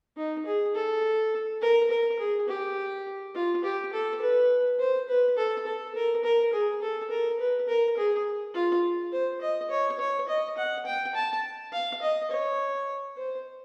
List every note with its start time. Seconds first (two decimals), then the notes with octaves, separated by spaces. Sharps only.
0.17 D#4
0.46 G#4
0.75 A4
1.62 A#4
1.91 A#4
2.19 G#4
2.48 G4
3.35 F4
3.64 G4
3.93 A4
4.21 B4
4.79 C5
5.09 B4
5.37 A4
5.66 A4
5.95 A#4
6.24 A#4
6.53 G#4
6.82 A4
7.10 A#4
7.39 B4
7.68 A#4
7.97 G#4
8.54 F4
9.12 C5
9.41 D#5
9.70 C#5
9.99 C#5
10.28 D#5
10.58 F#5
10.86 G5
11.15 A5
11.73 F5
12.02 D#5
12.31 C#5
13.17 C5